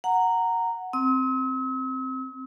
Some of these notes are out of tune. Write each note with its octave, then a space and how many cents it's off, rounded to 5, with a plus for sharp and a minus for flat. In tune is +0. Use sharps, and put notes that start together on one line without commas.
F#5 +0 A#5 -10
C4 +5 E6 -45